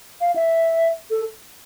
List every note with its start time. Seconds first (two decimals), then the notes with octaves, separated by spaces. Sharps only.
0.21 F5
0.36 E5
1.11 A4